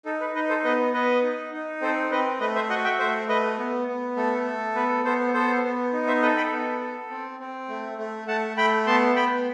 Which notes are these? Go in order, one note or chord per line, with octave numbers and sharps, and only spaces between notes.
D#4 A4
B4
D#4 B4 D#5
A4 C5
B3 B4 D#5
B3 B4 D#5
D#4
D#4
C4 A4 C5
C4 B4 D#5
A3 B4 D#5
C5 E5
F#4 D#5 F#5
E5 G5
A3 C5 E5
A3 B4 D#5
B3
B3
A3 A4
A4
B3 B4
B3 A4 C5
B3 A4 C5
B3
D#4
C5 E5
A4 B4 D#5
G5 B5
B3
A4
C4
C4
A3
A3
A3 F#5 A5
A3 G5 B5
B3 A5 C6
B3 G5 B5